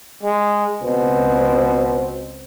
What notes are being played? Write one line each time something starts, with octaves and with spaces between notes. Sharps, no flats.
G#3
C#2 B2 C4